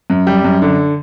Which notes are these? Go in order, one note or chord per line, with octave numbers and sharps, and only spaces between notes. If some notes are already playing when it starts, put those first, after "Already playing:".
F#2
G3
F#2
D3